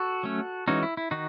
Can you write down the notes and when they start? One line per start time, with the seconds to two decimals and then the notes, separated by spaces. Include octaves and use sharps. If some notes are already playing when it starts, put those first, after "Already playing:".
Already playing: F#4 A4
0.23 F#3 A3 C#4
0.68 E3 G#3 C#4 D#4 F#4
0.83 E4
0.97 E4
1.11 D#3 D#4 F#4